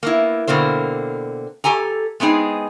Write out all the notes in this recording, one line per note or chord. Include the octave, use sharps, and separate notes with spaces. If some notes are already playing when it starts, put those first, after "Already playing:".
A#3 B3 E4
B2 D3 A#3 C4 C5
G4 A4 G#5 A#5
G#3 B3 C4 D#4 G#4